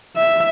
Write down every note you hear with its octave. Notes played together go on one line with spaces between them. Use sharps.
E5